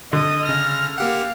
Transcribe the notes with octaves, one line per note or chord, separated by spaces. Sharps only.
D3 D#5 D#6
C#3 F6 A#6
A#3 G4 F5 F#5